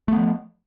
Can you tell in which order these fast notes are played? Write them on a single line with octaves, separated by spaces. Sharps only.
A3 B3 F3